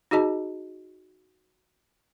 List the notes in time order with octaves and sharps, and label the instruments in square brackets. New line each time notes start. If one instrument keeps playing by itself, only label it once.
[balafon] D#4 F#4 G#4 D#5 A5